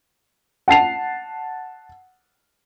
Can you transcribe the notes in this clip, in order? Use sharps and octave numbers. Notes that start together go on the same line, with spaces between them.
F#5 A5 C7 F7